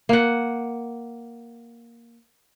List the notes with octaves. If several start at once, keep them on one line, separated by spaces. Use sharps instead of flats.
A#3 F#5